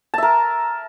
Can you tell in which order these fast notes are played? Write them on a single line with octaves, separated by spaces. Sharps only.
A5 E5 A#4